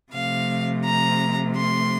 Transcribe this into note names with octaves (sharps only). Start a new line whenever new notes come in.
C3 F3 A3 F5
A#5
C6